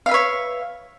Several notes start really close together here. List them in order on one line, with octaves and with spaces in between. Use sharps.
F5 E5 B4 C#5